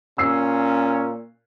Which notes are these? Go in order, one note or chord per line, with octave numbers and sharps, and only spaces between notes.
A#2 C#4 E6 C7